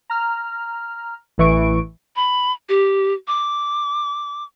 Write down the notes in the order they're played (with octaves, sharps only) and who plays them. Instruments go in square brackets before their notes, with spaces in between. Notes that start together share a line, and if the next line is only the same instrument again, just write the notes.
[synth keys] A#5 F6
A1 E3 C#6 D7
[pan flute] B5
G4
D6